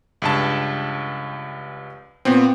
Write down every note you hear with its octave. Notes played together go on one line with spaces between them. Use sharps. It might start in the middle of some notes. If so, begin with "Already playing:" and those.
C#2 G2 A5
A#2 B3 C4